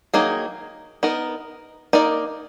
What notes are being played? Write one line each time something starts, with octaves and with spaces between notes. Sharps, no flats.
D#3 F#3 A#3 D#4 G#4
B3 D#4 A#4
A#3 D#4 A#4 D5